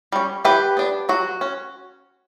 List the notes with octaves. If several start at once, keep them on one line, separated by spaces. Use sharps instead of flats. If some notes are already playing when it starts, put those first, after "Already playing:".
G3 C#4
E3 G4 B4
B3 D4
F#3 F#4
C#4